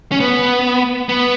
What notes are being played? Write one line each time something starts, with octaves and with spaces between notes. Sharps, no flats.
C#4
B3
B3